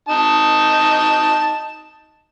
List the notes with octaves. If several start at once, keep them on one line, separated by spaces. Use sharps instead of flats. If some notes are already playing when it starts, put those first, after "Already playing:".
D#4 A5